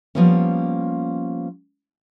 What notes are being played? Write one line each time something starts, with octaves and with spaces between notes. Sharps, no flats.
F3 G3 A#3 B3 C#4